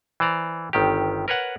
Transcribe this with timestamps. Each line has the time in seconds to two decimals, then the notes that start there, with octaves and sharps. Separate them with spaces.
0.20 E3 C5 D5 A#5
0.73 G1 D#3 G4
1.28 A#4 B4 C#5 F#5